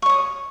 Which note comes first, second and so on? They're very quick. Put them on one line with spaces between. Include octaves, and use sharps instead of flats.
C#6 C#5 D#6